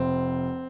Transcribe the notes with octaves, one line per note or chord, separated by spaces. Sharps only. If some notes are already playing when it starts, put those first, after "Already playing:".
Already playing: F1 C4